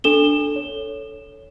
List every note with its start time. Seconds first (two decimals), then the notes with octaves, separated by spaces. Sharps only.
0.04 D4 A4 E7 G7
0.56 C#5